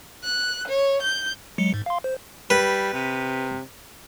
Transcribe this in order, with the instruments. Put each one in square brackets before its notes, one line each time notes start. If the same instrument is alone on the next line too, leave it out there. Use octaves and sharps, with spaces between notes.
[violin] F#6
C#5
G6
[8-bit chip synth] F#3 G#3 C#7
G#2
F5 C6
C5
[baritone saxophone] G3 [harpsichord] B4
[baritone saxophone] C3